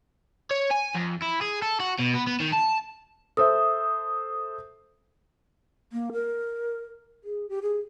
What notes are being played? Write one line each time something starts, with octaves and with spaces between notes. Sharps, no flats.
C#5
G#5
F2
E4
G#4
A4
F#4
B2
B3
B3
D#3
A5
A4 C5 E5 D#6
A#3
A#4
G#4
G4
G#4